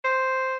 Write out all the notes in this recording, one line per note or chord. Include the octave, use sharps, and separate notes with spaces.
C5